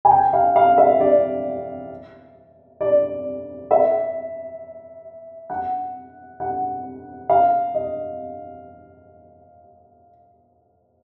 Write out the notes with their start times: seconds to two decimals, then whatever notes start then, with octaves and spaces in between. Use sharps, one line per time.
0.05 G#5
0.11 G5
0.33 F5
0.56 F5
0.78 E5
1.00 D5
2.81 D5
3.71 E5
5.50 F#5
6.40 F#5
7.29 F5
7.74 D#5